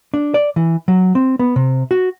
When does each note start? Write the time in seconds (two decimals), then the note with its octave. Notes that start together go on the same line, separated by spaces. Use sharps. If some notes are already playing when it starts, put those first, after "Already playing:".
0.14 D4
0.34 D5
0.56 E3
0.88 F#3
1.15 C4
1.39 B3
1.56 C3
1.91 F#4